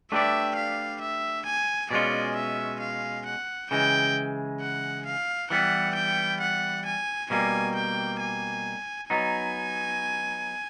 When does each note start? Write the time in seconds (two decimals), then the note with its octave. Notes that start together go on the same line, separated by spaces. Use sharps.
0.11 A3 D4 G4 B4 D5 E5
0.56 F5
1.02 E5
1.46 G#5
1.91 B2 G#3 C#4 F4 D5
2.36 E5
2.80 F5
3.26 F#5
3.71 C#3 E3 G#3 G5
4.61 F#5
5.06 F5
5.50 E3 G3 B3 F#5
5.95 G5
6.41 F#5
6.86 G#5
7.30 B2 G3 A#3 G#5
7.76 G5
8.20 G#5
9.10 F#3 B3 D#4 G#5